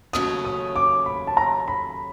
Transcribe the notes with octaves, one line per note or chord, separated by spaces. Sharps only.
D#2 C#3 F#3 A3 C#4 D#6
D#6
D6
B5
A5
A#5
B5